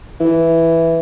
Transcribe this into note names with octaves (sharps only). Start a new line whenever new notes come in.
E3